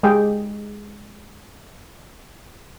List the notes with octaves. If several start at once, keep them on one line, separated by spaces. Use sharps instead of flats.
G#3 G4 G#4 G5